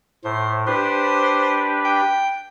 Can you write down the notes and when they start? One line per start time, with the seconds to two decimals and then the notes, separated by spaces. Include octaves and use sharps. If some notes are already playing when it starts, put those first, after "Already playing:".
0.24 A2 C5
0.67 D4 G4 B4 C5
1.84 G5